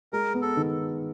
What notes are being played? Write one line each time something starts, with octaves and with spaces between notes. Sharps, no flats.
G#3 A#4
B3
A4
D#3